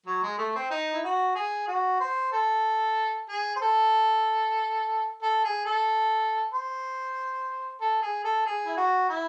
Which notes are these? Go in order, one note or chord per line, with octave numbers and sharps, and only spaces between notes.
F#3
G#3
A3
C4
D#4
E4
F#4
G#4
F#4
C5
A4
G#4
C5
A4
A4
G#4
A4
C5
A4
G#4
A4
G#4
E4
F#4
E4